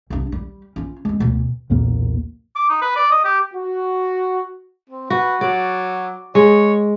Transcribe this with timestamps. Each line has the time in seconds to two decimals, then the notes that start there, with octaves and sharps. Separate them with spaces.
0.10 C2 D4
0.32 G3
0.76 C#4 F4
1.05 G#3 C4
1.20 D2 B2
1.70 B1 E2 A#2 A#3
2.55 D6
2.69 D#4
2.81 B4
2.96 D5
3.11 D#5
3.25 G4
3.54 F#4
4.90 C4
5.10 F#4 B4
5.41 F#3 D5
6.35 G#3 C#5